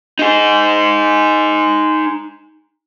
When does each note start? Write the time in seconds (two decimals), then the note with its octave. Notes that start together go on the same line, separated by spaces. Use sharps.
0.19 D#4 G#4